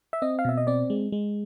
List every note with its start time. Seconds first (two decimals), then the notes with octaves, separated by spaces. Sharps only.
0.13 E5
0.22 C4 D#5
0.39 F5
0.45 B2 E5
0.57 D#5
0.67 C4 D5
0.90 G#3
1.12 G#3